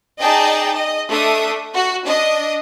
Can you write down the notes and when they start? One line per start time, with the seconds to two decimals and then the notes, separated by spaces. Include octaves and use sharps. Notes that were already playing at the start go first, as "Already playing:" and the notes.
0.20 D#4 G#4 D5 D#5 G5 A5
0.74 D#5
1.09 A3 D4 E5 D#6
1.74 F#4
2.06 D4 D#5